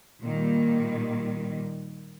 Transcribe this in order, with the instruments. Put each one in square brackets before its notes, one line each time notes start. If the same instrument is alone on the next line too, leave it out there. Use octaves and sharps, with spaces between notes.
[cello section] A#2 D#3 G3